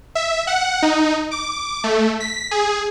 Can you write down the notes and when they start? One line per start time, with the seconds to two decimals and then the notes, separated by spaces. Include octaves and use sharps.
0.15 E5
0.47 F#5
0.82 D#4
1.31 D6
1.84 A3
2.20 B6
2.51 G#4